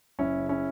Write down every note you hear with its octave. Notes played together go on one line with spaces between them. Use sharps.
F#1 C#4 E4
C#3
C#4 E4